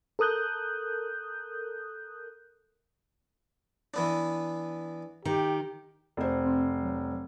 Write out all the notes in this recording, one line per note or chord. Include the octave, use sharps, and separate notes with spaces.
A4 A#4 D#6 F#6 G6
E3 B3 D4
D#3 G4
F1 C5
C4
F#3